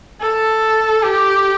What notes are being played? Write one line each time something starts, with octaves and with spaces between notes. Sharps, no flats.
A4
G4